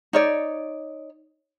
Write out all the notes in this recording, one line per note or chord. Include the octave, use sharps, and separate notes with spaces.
D#4 C#5 D5